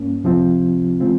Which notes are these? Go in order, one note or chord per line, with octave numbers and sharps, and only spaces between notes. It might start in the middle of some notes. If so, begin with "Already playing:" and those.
Already playing: G2 A#3 C#4
C#2 C3 F3 C4 F4
C#3 E3 G#3 C4 F4